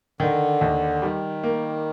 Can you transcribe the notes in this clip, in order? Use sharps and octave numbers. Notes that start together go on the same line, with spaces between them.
D3 D#3
D#2
D#3 G3
A#3